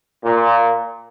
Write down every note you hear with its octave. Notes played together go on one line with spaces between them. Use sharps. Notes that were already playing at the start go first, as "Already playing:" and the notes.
A#2